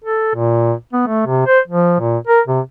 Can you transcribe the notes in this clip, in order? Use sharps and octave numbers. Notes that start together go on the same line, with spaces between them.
A4
A#2
B3
A3
C3
C5
F3
A#2
A#4
C3